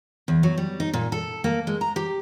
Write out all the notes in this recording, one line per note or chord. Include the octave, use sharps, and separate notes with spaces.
E2
F#3
G3
D#4
A#2
A4
A#3
G#3
A#5
G4